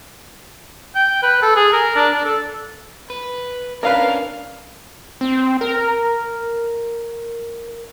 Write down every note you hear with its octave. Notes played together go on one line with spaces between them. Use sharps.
G5
B4
A4
G#4
A#4
D4
D4
A4
B4
C#4 D4 A#4 B4 F5
C4
A#4